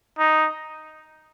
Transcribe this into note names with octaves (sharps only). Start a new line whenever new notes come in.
D#4